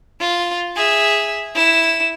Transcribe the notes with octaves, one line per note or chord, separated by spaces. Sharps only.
F4
G#4 E5
E4 E7